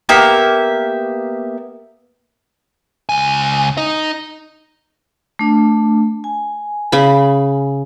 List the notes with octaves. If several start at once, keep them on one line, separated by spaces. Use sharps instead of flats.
A#3 B3 G4 E5
C#2 G#5
D#4 D#5
A3 D4
G#5
C#3 B5